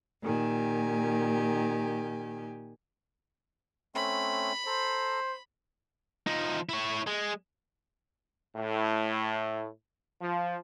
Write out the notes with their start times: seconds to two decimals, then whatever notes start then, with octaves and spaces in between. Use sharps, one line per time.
0.22 A#2 D#3 G4 G#5
3.95 A3 C4 C#4 B5
4.66 A4 C5 A#5
6.27 F3 D#4
6.69 E4 C#5
7.07 G#3
8.56 A2
10.20 F3